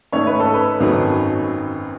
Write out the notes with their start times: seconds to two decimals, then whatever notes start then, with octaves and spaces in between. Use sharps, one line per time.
0.12 G#2 D#3 A3 C#4 C#5
0.27 B4
0.40 A4
0.54 B4
0.80 G#1 F#2 D#3 F#3